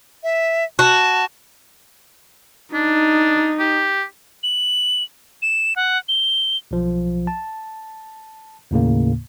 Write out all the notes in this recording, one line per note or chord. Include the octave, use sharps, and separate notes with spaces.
E5
F#4 A5
D4 D#4
G4
F#7
E7
F#5
G7
B1 F3
A5
D#2 A2 C#3 A#3